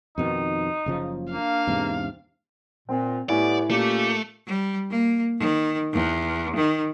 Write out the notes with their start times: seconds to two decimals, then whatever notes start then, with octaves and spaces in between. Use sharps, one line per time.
0.18 F2 B2 D#3 D#4
0.86 F#1 C#3 F3
1.32 A#3 D4 F5
1.67 E2 G#2 C3
2.89 A#2 C4
3.29 A2 B3 G4 D5 G#5
3.70 A#2 A3 A#3 C#4 G4
4.47 G3
4.90 A#3
5.39 D#3
5.93 E2
6.56 D#3